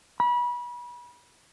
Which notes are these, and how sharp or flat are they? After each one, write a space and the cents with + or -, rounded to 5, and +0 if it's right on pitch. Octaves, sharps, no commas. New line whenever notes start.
B5 -30